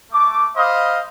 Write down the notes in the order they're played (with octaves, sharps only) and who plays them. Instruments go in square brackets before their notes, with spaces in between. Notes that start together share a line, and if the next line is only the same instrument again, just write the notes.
[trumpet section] A3 D6
C5 D#5 F5 B5